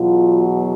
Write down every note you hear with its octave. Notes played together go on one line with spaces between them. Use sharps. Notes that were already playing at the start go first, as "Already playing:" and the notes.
Already playing: E2 B2 F#3 F4